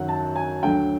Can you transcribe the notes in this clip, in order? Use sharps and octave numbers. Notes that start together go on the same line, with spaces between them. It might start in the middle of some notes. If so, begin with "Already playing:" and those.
Already playing: F#2 D#3 F#3 F#5
A5
G#5
D2 D3 F#3 G5